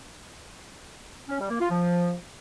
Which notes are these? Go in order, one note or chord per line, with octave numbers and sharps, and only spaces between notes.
C#4
G3
A#3
F4
F3